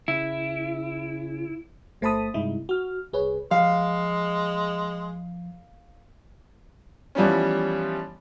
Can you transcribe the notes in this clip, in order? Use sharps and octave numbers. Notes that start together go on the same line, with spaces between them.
C#3 E4
G1 A3 C5 A5 B5 D#6
G2 C3 G#3 D#4 E4
F#4 F6
C2 G#4 B4 C#5
F3 G#3 F5
E3 F3 G3 B3 C#4